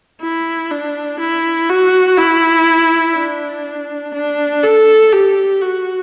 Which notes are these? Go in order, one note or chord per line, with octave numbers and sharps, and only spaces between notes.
E4
D4
E4
F#4
E4
D4
D4
A4
G4
F#4